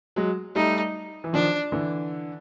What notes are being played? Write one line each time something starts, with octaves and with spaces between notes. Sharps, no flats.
F#3 G#3
G3 A3 D#4
E3
D#3 F3 D4
D3 E3